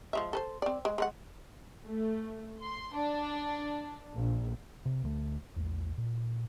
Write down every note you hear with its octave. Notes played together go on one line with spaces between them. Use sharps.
F3 G#3 E5
A4 B4 C5
C4 D5
G#3
G#3 B4 F#5
A3
C6
D4
A#1
C3
D2 F#3 A3
A#1 E2
A#2